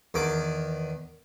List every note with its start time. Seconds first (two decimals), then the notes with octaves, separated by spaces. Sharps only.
0.14 E2 D#3 D6